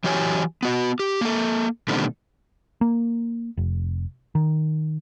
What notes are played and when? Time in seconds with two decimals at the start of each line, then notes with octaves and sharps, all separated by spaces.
0.04 E3 F#3 G4 C#5 G5 G#5
0.63 B3 F#4
1.00 G4
1.21 A#3 A4
1.88 B2 D3 D#3 G3 A3 C4
2.81 A#3
3.57 F1
4.35 D#3